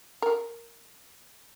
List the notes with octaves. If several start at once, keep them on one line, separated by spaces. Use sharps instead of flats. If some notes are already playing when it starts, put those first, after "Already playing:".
A#4